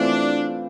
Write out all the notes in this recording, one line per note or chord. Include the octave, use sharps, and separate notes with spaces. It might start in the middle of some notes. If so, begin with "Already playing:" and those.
Already playing: E3 A3 C4 D4 F4